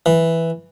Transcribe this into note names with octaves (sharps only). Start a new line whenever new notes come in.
E3